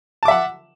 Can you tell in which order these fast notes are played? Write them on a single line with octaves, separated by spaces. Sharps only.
A5 D6 E5 F#5